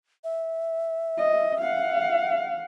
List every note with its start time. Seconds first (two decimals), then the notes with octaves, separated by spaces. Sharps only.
0.24 E5
1.18 D#5
1.60 F5 F#5